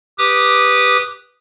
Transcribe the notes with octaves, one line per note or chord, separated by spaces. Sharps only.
G4 B4 D6 D#6